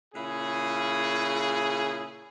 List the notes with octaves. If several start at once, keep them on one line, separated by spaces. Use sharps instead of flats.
A#2 C#3 E4 G#4